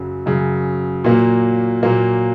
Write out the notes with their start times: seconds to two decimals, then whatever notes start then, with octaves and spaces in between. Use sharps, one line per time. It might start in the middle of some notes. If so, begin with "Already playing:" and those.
Already playing: F#2 C#3 F#3
0.26 F#2 C#3 F#3
1.04 A#2 F#3 A#3
1.83 A#2 F#3 A#3